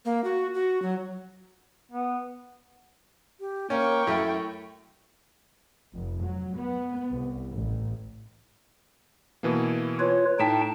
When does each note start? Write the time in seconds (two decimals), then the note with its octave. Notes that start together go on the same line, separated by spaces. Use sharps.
0.05 A#3
0.24 F#4
0.54 F#4
0.82 F#3
1.92 B3
3.40 G4
3.70 A#3 C#4 G5 C#6
4.07 F#2 A3 E4
5.94 F1
6.24 F#3
6.58 B3
7.10 C2
7.54 A1
9.43 B2 E3 A#3
10.00 F4 B4 C#5
10.39 A2 D#4 G5 A5 B6